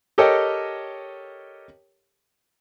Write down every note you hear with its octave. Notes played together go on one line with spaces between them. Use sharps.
G4 A4 A#4 C#5 D#5 G5